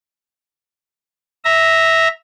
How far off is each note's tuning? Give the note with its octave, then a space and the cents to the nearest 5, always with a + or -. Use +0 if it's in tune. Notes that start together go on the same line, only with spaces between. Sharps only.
E5 -10 A#5 +0